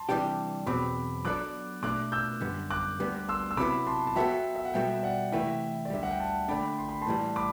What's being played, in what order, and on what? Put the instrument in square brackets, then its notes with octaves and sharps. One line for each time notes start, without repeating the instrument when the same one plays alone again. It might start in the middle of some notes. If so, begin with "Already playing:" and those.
Already playing: [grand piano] A5 C6
[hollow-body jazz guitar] C3 E3 G3 D4 G4
[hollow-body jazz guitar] E2 B2 F#3 C4 [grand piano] B5 D6
[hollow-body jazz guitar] F#3 B3 D4 A4 D5 [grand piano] D6 F#6
[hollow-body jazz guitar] B2 A3 D4 [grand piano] D6 F#6
[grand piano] E6 G6
[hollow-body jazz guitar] F#2 D3 G3 B3
[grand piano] D6 F#6
[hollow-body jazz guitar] D2 D3 G3 B3 D4
[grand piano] C6 E6
E6
[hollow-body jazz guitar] C3 F#3 B3 E4 [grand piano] B5 D6
[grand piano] A5 C6
A5
[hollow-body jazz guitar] F#3 B3 F#4 A4 [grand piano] E5 G5
[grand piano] E5
F#5
[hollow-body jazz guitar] B2 G3 B3 F#4 A4 [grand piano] E5 G5
[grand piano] D5 F#5
[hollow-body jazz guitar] C3 E3 A3 E4 B4 [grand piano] E5 G5
[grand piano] D5
[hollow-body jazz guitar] D2 D3 G3 [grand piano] E5
[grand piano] F#5
G5
F#5 A5
[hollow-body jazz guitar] D3 A3 D4 [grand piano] G5 B5
[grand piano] C6
B5
A5 C6
[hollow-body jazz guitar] A2 E3 G3
[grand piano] B5 D6